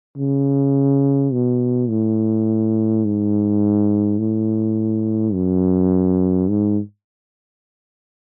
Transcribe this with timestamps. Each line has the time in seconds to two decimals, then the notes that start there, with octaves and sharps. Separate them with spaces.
0.17 C#3
1.33 B2
1.89 A2
3.05 G#2
4.19 A2
5.34 F#2
6.49 G#2